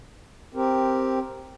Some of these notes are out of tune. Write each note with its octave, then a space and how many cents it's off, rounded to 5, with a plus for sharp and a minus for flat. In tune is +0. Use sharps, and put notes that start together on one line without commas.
C4 +0 G4 +0 A#4 +0